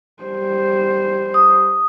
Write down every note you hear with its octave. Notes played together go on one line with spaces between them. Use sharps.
G3 C5
D#6